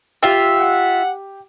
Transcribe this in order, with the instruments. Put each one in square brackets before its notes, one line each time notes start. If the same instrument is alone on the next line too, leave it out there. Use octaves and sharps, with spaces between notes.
[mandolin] F4 E5 [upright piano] G4
[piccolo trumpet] F#5